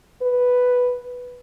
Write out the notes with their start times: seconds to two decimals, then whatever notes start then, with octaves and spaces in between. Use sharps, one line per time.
0.22 B4